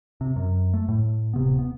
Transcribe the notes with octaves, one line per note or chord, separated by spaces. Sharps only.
C3
F#2
A3
A2
D1 C3 B3
B3